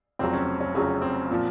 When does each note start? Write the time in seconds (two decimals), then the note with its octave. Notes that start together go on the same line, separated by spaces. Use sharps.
0.19 F1 F2 C#3 F#3 C4
0.33 C#4
0.61 C#4
0.75 F1 F2 C#3 F#3 C#4
1.02 C4
1.31 A#2 F3